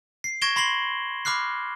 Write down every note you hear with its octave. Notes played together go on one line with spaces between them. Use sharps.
C7
C#6 G#6 A#6 D7 E7 G7
B5 C6 A#6 C7 F#7 G7
B5 D6 F6 F#6 C7